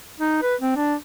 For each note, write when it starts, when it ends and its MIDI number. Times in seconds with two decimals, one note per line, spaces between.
0.20 0.41 63
0.42 0.55 71
0.61 0.75 60
0.76 0.94 62